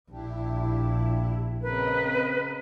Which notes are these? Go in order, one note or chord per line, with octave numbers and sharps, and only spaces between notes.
A#1 D4 E4 G4
C#3 C4 A#4 B4 D#5